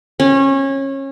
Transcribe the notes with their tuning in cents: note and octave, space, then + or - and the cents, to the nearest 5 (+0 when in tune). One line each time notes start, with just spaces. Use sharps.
C#4 -25